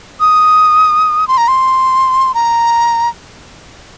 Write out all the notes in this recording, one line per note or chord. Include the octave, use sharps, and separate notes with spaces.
D#6
C6
A#5
C6
A#5